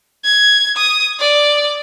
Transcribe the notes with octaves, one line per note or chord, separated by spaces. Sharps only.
G#6
D#6
D5